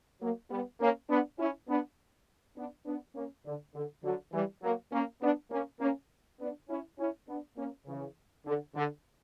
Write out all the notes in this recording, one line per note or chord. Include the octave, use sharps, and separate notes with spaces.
F#3 A#3
G3 B3
A#3 C#4
B3 D4
C#4 E4
B3 D4
B3 D4
B3 D4
A#3 C#4
D3
D3
D3 F#3
E3 G3
F#3 A#3
A#3 C#4
B3 D4
A#3 C#4
A#3 C#4
B3 D4
C#4 E4
C#4 E4
B3 D4
A#3 C#4
C#3 E3
D3
D3